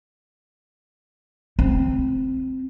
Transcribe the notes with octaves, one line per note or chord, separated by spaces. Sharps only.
C4